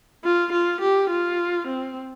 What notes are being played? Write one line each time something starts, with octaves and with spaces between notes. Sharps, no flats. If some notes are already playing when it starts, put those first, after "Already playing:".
F4
F4
G4
F4
C4